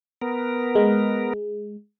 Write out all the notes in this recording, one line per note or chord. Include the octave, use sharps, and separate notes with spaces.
B3 A#4
G#3